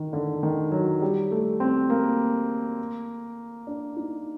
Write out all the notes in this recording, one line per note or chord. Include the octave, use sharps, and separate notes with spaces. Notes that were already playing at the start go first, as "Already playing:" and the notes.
Already playing: D#3
D3
D#3
F#3
G3
A3
C4
A#3
D4
D#4